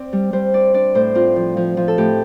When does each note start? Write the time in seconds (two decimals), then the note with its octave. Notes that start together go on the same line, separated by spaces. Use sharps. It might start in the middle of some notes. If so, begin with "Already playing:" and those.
Already playing: C4 D5
0.13 G3
0.33 G3 C5
0.54 D4 D5
0.74 D4 D5
0.95 A2 C5
1.15 C4 F4
1.36 F3
1.57 F3
1.77 F3
1.88 A4
1.98 A2 G4